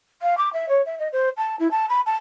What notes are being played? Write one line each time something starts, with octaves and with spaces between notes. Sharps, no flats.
F5
D6
E5
C#5
E5
D#5
C5
A5
E4
A5
B5
A5